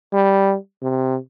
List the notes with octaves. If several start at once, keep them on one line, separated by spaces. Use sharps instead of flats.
G3
C3